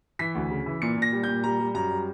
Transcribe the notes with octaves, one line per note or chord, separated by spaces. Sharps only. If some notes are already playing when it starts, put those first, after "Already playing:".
E3 B6
D2
C#3
E3
A#2 C#7
A#2 A#6
G3
A#2 G6
G3 A#5
G3
F#2 A#5
G3